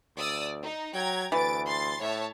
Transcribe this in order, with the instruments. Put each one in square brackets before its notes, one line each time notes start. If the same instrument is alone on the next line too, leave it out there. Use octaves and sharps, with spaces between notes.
[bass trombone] D2 [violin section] D5 D#6 E6
[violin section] D#4
[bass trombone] F#3 [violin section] G5 A#5 G#6
[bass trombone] D2 [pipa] E3 [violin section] A6 D7
[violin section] C6 A6 C7
[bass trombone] A2 [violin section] C#5 E5 A5